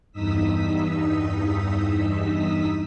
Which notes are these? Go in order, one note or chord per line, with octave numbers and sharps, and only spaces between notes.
E2 G2 D#4 D#6 E6 B6